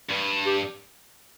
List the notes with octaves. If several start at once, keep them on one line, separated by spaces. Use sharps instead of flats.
G2
G4